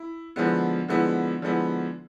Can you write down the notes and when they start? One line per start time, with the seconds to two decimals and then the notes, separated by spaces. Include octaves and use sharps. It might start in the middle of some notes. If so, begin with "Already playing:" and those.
Already playing: E4
0.36 D3 F3 G#3 B3 E4
0.88 D3 F3 G#3 B3 E4
1.42 D3 F3 G#3 B3 E4